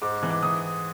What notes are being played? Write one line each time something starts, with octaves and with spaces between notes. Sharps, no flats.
G#2 D6
E3
D6
E3 D#6